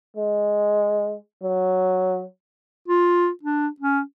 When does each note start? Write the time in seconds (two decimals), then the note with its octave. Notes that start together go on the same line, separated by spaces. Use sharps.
0.17 G#3
1.43 F#3
2.88 F4
3.43 D4
3.80 C#4